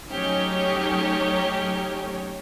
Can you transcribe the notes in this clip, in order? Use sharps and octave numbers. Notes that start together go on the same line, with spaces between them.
F#3 A3 C#4 D#4 G4 C#5